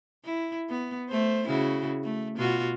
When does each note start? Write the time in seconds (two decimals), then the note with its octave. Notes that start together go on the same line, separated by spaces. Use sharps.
0.25 E4
0.70 B3
1.09 A3 C5
1.46 C#3 E4 F#4
2.04 A3
2.37 B2 F4 F#4